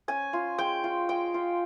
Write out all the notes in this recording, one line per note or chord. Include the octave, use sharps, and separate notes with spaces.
C#4 G#5
F4
G#3 G5
F4
G#3 G5
F4